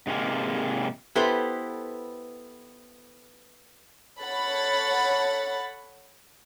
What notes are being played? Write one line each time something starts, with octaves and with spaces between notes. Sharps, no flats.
G#2 C3 G#3 A#3
B3 E4 G4 A4 B4 C5
A4 C#5 F#5 B5 A6